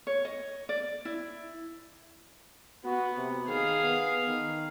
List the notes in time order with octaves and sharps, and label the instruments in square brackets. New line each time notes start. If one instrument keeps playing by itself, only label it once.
[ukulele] C#5
D#5
D5
E4
[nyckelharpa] B3 [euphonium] F#4
[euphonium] C3
[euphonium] D#3 [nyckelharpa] G#4 F5
[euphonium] B3
D#3